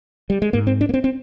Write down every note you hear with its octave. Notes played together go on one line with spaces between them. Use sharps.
G3
G#3
G#2 A#3
C4
D4
A#3
C4
C4